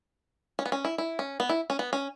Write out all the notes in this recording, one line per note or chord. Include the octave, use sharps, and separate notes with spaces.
C#4
B3
C#4
E4
E4
C#4
B3
E4
C#4
B3
C#4